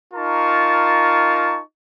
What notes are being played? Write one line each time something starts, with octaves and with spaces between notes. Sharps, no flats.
D#4 F4 A#4 A5 C#6